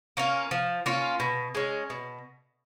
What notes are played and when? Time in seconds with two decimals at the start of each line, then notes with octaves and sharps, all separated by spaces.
0.17 A#3 C#4 F4
0.51 F3
0.86 A#3 C#4 F4
1.20 B2
1.55 G#3 C#4
1.90 B2